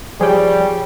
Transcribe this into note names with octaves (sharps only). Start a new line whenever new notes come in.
F3 G3 G#4 C#5 G5